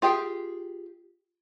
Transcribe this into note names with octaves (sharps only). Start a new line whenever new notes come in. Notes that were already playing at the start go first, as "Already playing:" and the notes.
F4 G4 G#4 G5